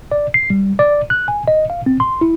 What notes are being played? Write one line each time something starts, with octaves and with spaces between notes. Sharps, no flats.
D5
C7
G3
D5
F#6
G#5
D#5
F5
C4
C6
E4